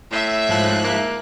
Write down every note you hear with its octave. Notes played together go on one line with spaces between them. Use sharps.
A2 E5
G#2 F3 F#6
A#3